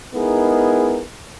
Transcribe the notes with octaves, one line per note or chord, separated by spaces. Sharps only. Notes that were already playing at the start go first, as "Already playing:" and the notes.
G#3 B3 D#4 E4 G#4 A#4